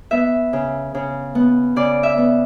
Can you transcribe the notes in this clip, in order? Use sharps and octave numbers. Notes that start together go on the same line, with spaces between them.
B3 E5
C#3
C#3
B3
C#3 D5
E5
B3